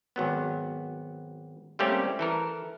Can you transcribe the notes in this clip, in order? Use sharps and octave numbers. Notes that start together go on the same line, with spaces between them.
G#1 F#3 B3
G3 A3 A#3 C4 C#4 G4
E3 A4 A#4